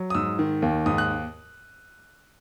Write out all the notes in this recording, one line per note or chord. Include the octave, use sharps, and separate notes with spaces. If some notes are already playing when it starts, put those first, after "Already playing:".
Already playing: F#3
D#6
G#2 E6
D#3
D#2
G#2 D#6
F#6